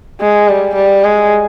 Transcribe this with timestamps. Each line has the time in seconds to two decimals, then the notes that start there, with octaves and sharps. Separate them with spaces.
0.21 G#3
0.48 G3
0.76 G3
1.04 G#3